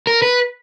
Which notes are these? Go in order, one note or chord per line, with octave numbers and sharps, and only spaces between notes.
A#4
B4